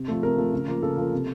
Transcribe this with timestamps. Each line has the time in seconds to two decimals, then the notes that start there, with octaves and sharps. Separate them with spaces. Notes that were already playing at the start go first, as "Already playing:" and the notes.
Already playing: C3
0.08 F3 A3
0.22 C3 A#4
0.37 F3 A3
0.53 C#3
0.68 F3 A#3
0.82 C#3 A4
0.97 F3 A#3
1.13 C3